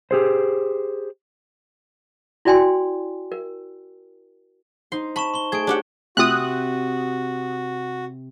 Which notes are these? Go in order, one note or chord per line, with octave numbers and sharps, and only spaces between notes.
G4 G#4 C5
E4 F#4 D5 G5 G#5 C6
A#4
D#4 C5 C6
A5 B5 C#6 E7
C6 G7
A3 G#4 G#6 D7
D4 G4 F#5
C3 A3 C4 F4 F#4 D#6 F#6